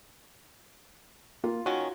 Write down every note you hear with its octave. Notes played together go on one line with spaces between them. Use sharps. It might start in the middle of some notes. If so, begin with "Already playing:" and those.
A#3 F4
D#3 C#4 F#4